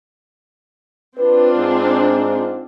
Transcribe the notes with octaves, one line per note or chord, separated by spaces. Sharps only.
C4 D4 F4 B4
G#2